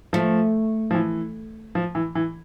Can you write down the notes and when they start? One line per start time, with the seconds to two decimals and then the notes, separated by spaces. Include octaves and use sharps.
0.13 F3 A3
0.91 F3
0.94 E3
1.75 F3
1.95 E3
2.15 E3